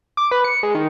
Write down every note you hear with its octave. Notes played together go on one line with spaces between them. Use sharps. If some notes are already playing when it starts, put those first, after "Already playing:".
D6
B4
C#7
G#3
D#3